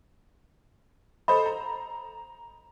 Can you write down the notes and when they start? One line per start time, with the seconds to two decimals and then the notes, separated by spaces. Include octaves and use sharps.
1.28 A4 C5 D#5 B5
1.46 A#5